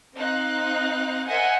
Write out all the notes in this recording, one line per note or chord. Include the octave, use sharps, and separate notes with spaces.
C4 D#4 F5 F#6
A#4 C5 D#5 E5 F#5 G#5